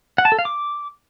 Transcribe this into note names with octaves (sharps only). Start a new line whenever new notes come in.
F#5
A5
A4
F5
D6